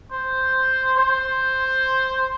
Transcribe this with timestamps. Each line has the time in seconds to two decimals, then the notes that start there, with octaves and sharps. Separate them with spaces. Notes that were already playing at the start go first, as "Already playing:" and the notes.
0.12 C5
0.97 C5